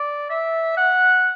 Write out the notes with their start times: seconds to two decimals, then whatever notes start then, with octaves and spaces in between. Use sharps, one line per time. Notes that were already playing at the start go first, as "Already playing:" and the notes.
Already playing: D5
0.30 E5
0.77 F#5